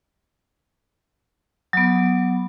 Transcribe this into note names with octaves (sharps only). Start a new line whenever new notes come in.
F#3 B3